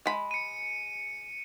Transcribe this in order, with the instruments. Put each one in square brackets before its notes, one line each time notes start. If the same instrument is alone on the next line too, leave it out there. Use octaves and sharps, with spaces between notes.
[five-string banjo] G#3 B5
[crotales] C#7 D#7